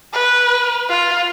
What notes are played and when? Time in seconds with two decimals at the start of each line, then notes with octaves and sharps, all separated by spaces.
0.13 B4
0.89 F4